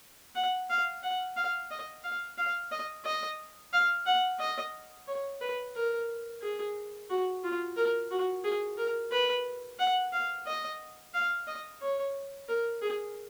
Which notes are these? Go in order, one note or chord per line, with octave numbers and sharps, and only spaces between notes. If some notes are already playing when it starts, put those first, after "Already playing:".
F#5
F5
F#5
F5
D#5
F5
F5
D#5
D#5
F5
F#5
D#5
C#5
B4
A#4
G#4
F#4
F4
A#4
F#4
G#4
A#4
B4
F#5
F5
D#5
F5
D#5
C#5
A#4
G#4